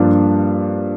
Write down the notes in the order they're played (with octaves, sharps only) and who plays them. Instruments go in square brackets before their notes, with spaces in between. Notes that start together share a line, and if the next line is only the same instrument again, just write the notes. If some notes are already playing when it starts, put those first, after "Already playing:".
Already playing: [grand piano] G2 F3 A#3 D4 F4